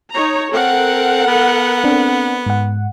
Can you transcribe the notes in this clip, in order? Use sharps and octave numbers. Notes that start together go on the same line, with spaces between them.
D#4 C#5 A#5
C4 A4 A#4 F#5
B3
C4 D4
G#2 F#5